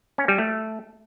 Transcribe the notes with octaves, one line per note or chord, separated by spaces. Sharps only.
C#4
G3
A3